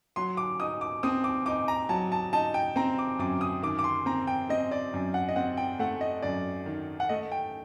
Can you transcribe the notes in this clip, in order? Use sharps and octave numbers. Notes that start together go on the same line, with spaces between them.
F#3 C6
D6
D#4 D#6
D6
C4 D#6
D6
D#4 D6
A#5
F#3 A5
A5
D#4 A5
G5
C4 A#5
D6
F#2 D6
D#6
D#3 D6
D6
C6
C4 A#5
G5
C4 D#5
D5
F#2
F#5
D#5
C4 F#5
G5
A3 F#5
D#5
F#2 D5
D#3
F#5
A3 D#5
G5